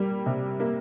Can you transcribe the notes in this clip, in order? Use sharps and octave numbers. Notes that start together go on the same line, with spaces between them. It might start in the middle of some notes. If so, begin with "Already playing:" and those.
Already playing: G3 A#3
C3
A#3